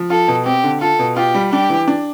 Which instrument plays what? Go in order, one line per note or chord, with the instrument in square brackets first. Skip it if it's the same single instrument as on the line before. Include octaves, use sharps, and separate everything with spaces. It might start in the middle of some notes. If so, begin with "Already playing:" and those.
Already playing: [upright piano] F3
[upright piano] F4 [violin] A4
[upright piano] B2
[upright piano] C4 [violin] G4
[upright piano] D3
[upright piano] F4 [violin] A4
[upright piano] B2
[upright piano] F4 [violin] G4
[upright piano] G3
[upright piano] D4 [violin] G4
[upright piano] E3
D4